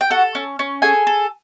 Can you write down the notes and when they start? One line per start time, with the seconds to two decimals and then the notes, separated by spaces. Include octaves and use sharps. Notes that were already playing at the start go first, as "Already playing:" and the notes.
0.01 G5
0.11 F#4 A4 F#5
0.35 C#4
0.59 C#4
0.82 G#4 A4 G#5
1.07 A4